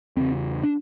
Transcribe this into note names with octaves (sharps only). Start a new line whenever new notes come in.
E2 C#3 C4
D4